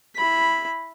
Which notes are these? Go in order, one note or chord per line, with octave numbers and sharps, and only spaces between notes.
E4 B5